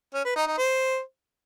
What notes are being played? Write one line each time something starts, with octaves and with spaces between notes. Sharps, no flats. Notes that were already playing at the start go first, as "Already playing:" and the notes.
C#4
B4
D#4
D#4
C5